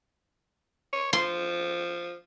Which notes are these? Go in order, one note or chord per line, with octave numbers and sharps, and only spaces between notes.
C#5
F3 C6